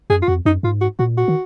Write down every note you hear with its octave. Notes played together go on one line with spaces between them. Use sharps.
F#2 G#4
F4
F2 F#4
F#2 D#4
G#2 F4
F#4
A#2 F#4
F#4
D#3